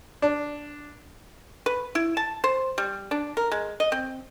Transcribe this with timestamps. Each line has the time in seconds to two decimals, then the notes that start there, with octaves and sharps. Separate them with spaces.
0.22 D4
1.66 B4
1.95 E4
2.17 A5
2.44 C5
2.78 G3
3.11 D4
3.37 A#4
3.52 G#3
3.80 D#5
3.92 C4